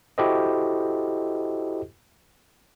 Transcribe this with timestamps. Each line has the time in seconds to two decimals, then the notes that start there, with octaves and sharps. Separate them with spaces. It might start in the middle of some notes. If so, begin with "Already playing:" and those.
0.18 E4 F#4 G4 A4 C5 D#5